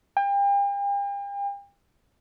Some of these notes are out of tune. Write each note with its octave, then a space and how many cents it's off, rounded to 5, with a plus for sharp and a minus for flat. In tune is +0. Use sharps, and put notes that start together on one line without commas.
G5 +40